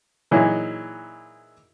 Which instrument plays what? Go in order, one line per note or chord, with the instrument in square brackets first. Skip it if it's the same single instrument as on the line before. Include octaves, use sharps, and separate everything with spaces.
[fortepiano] A#2 E3 F#3 G#3 D#4 E4